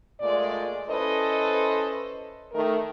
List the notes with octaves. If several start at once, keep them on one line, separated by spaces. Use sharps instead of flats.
A#2 G#3 A3 D5
C#4 E4 A4 B4 C5 D#5
D#3 A3 A#4